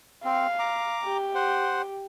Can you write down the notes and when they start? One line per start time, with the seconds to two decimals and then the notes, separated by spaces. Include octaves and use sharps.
0.25 C4 F5
0.59 A#5 D6
1.04 G4
1.35 C5 F#5